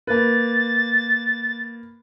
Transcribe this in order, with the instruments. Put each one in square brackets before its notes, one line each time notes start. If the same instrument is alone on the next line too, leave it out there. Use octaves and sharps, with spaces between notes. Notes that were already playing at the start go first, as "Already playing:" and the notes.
[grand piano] A#3 B4 [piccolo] A6